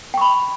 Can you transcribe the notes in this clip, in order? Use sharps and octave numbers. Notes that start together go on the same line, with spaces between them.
G5 B5 C#6